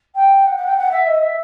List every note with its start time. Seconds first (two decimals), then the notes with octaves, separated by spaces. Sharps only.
0.15 G5
0.47 F#5
0.57 F#5
0.66 G5
0.77 F#5
0.91 E5
1.07 D#5
1.22 E5